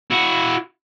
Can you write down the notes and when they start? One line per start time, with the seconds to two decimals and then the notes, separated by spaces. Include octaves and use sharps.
0.11 E4 F#4